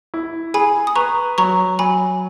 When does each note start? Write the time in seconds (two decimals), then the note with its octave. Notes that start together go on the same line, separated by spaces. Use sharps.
0.14 E4
0.54 G#4 G#5 B5
0.87 D#6
0.96 B4 A#5 C#6
1.38 F#3 A#5 C#6
1.79 F#3 G#5 B5